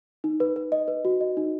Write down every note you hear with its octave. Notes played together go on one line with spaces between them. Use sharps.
D#4
B4
B4
D#5
B4
F#4
D#5
D#4